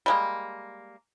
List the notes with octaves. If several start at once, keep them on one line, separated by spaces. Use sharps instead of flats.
G3 G#3 A#3